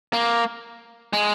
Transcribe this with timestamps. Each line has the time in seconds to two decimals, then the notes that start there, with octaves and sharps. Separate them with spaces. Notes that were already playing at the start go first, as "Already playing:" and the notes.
0.13 A#3
1.13 G#3